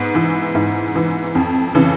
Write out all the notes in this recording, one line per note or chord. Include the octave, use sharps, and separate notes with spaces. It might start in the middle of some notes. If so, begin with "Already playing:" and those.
Already playing: G#2 B3
E3
G#2
E3
F2
C#3 E3